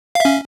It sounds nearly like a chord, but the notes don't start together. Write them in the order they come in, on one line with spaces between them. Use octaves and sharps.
F5 E5 C#4